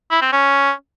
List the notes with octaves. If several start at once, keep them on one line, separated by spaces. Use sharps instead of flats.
E4
C4
C#4